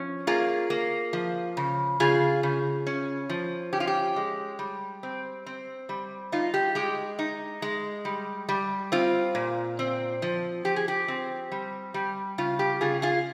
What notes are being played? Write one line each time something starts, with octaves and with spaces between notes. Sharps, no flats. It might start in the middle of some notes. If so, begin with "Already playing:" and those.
Already playing: F3 C#4
A#3 F4 G#4
A#3
F3
C#3
C#3 F4 G#4
C#3
C#4
F3
C#4 G4
F4
G4
G#3
G3
C4
C4
G3
D#4 F4
G4
G#3 G4
D#4
G#3
G3
G3
C4 F4
A#2
C4
F3
F3 G4
G#4
G4
C4
G3
G3
C#3 F4
G4
C#3 F4 G#4
F4 G#4